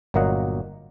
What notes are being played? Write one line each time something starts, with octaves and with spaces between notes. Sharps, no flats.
G1 A#2 F#3 A#3 D#5 F#5